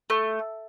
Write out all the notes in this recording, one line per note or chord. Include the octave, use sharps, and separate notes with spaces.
A3